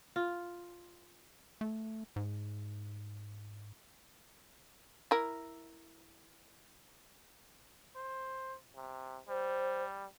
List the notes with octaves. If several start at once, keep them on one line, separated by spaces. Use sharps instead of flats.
F4
A3
G#2
E4 A#4
C5
C3
G3 C5